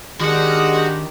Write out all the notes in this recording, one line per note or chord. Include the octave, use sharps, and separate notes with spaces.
D#3 G#3 D4 F#4 G4 F#5